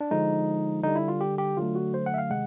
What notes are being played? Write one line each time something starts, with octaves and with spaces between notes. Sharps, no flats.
D4
D3 F3 G#3 D#4
D3 G3 D#4
E4
F4
G4
G4
D3 F#3 A3 F4
F#4
C5
F#5
E5
F5
C3 D#3 G#3 F#5